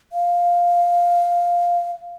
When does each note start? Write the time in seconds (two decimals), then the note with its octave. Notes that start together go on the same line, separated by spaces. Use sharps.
0.12 F5